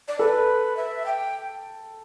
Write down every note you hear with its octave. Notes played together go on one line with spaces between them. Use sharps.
D5
A4 B4
E5
G5